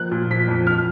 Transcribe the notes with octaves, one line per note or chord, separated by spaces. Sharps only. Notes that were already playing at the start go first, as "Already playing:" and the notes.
Already playing: F3 A#3 F#6
A#2
F3 B6
F2
F3 F6